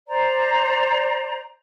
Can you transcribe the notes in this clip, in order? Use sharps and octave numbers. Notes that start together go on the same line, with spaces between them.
C5 D5 A#5